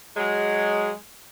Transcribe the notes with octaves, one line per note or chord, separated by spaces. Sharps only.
F#3 G#3